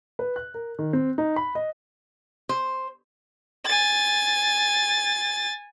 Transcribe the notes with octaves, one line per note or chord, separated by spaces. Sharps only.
B4
F#6
A#4
D#3
C4
D#4
B5
D#5
C5
G#5 A6